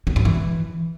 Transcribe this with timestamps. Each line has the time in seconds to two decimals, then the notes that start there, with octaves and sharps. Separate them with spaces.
0.07 F#3
0.16 G2
0.25 E3